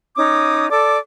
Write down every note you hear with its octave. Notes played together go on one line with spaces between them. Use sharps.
C#4 D#4 D6 D#6
A4 D5 D6